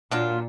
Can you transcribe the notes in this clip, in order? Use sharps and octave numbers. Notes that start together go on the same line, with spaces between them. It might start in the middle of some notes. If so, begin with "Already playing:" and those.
A#2 F#3 D4 F4